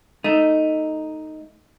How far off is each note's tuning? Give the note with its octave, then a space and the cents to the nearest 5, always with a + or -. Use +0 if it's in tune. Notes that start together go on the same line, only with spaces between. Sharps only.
A3 +0 D#4 +0